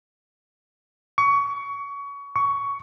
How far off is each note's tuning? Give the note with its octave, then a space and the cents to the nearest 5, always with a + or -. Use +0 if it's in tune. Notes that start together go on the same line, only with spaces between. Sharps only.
C#6 +25
C#6 +15